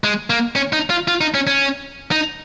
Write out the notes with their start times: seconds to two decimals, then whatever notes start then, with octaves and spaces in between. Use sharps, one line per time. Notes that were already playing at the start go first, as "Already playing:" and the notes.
0.04 G#3
0.30 A#3
0.56 C#4
0.73 D#4
0.90 F4
1.08 F4
1.21 D#4
1.34 C#4
1.47 C#4
2.11 D#4